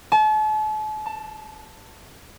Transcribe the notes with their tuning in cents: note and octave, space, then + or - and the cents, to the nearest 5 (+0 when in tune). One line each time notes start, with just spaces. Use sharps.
A5 -40
A5 +15